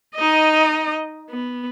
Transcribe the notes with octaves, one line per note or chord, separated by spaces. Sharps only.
D#4 D#5
B3